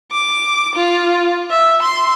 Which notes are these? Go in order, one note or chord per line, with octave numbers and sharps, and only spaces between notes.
D6
F4
E5
C6